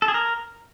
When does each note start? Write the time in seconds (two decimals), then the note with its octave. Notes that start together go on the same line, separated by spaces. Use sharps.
0.02 A4
0.08 G#4
0.14 A#4